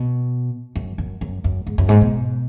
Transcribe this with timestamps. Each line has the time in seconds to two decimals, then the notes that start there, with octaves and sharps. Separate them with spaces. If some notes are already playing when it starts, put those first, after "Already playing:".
Already playing: B2
0.76 F#2
0.98 F#2
1.21 F#2
1.44 F#2
1.67 G#2
1.78 F#2
1.89 G#2
2.01 B2